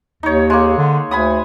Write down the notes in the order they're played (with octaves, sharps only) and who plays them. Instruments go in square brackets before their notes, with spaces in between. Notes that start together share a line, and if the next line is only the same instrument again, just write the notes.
[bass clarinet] D#2 [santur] D#4 C#5
[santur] G#3 A#3
[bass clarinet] D3
[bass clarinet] D2 [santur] G#5 B5 D#6